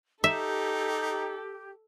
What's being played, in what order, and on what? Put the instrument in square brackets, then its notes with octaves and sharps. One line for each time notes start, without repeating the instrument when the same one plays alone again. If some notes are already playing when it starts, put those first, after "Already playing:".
[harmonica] D#4 [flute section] G4 [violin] A4 [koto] E5